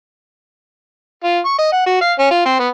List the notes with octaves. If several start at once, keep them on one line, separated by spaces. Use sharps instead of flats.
F4
C#6
D#5
F#5
F#4
F5
C#4
F4
C4
B3